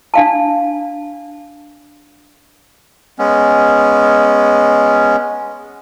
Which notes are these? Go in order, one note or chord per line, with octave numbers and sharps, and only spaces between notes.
D4 F5 A5
G#3 B3 C#4